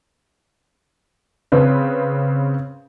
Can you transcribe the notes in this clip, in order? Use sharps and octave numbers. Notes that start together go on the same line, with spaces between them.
C#3 C4 B4